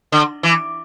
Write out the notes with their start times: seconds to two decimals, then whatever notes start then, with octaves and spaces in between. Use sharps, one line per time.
0.12 D3
0.43 E3